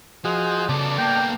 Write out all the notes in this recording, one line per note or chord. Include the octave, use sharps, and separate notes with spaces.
F3 F#4 G#4 C5 D#5
C#3 B3 A4 D5 A5
A#3 G5